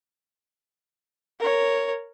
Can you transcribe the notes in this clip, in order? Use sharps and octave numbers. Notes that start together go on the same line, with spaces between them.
A#4 C#5